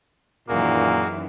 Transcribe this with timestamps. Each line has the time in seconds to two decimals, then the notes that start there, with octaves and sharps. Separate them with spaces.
0.49 F#2 A#2 D#3 E3 A#3 F#4 G#4